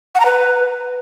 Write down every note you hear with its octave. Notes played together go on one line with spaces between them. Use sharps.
F#5
A#5
B4